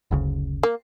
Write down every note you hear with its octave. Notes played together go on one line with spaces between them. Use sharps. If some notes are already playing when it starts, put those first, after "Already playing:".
F#1 D2 C#3
A#3